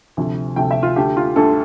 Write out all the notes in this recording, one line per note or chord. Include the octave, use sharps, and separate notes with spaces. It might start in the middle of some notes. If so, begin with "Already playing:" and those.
D2 C3 F3 A3
D2 C3 F3 A3 G5
E5
F4
D2 D3 A3 G4
F4
D2 D3 A3 A4